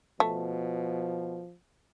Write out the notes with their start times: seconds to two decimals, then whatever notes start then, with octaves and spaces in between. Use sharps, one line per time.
0.20 B2 F3 A3